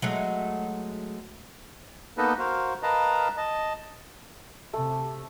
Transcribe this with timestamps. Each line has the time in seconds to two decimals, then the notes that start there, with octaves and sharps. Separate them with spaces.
0.02 F#3 G#3 A3
2.18 A#3 B3 D#4 A4 B4 D#5
2.39 F#4 A#4 C5 F5
2.83 A#4 B4 D#5 F5 A5 A#5
3.37 D#5 A5
4.73 C3 A3